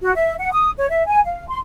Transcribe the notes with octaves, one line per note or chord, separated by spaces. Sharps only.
F#4
E5
F#5
D#6
C#5
E5
G#5
F5
C6